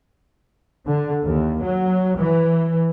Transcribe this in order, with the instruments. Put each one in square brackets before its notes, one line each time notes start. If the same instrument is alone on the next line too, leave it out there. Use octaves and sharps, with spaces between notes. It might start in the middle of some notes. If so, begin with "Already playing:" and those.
[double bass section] D3
D#2
F#3
E3